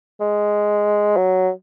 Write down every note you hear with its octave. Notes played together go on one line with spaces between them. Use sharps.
G#3
F#3